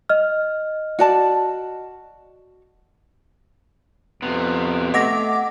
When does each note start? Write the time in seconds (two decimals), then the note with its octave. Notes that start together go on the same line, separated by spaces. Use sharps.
0.09 D#5 F6
0.99 F#4 D5 A5
4.22 F2 C3 B3
4.94 A3 D#5 F#5 D6 A#6